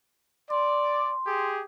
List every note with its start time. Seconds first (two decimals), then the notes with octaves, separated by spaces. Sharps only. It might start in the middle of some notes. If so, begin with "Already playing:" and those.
0.50 D5 C6
1.27 G4 G#4